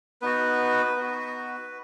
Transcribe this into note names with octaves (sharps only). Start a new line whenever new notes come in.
B3 D#4 F#4 B4
B3 D#4 F#4